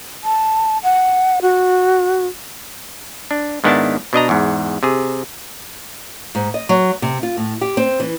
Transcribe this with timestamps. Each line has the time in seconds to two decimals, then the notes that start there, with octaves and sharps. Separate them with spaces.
0.24 A5
0.83 F#5
1.42 F#4
3.31 D4
3.64 G#2 D#3 B3 D4 E4 A5
4.13 B2 D4 D#5 A#5
4.29 E2 G#2
4.83 C3 G#4
6.35 G#2
6.54 D#5
6.69 F#3
7.02 C3
7.23 F4
7.37 A2
7.61 G4
7.77 C4
8.00 E3